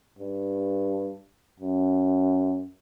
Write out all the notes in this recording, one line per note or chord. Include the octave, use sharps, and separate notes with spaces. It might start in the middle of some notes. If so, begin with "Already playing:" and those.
G2
F#2